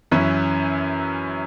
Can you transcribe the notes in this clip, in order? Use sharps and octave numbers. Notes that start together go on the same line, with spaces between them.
F#2 E3 C#4 E4